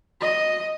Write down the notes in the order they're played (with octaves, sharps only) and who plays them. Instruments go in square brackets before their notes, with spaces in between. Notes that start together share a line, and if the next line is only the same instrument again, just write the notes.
[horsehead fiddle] D#5